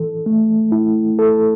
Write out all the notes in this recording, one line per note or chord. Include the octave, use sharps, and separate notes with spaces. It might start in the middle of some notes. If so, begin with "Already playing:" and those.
Already playing: E3 A4
A3
E4
A4